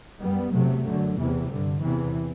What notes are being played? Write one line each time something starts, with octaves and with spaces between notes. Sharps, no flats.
F#2 G3 B3
E2 C3 F#3 A3
F#2 D3 F#3
E2 C3 E3
G2 D3
E2 C3 E3